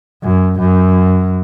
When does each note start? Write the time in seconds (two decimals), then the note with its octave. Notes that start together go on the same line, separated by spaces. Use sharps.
0.23 F#2
0.59 F#2